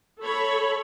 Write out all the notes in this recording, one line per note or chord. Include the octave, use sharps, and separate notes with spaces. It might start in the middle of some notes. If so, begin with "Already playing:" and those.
A4 C#5 B5